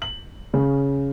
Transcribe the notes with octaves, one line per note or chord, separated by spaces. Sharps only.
F#7
C#3